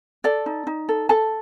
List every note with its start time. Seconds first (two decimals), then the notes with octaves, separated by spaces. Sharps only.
0.24 A4 D5
0.46 D#4
0.67 D#4
0.89 A4
1.09 A4 A5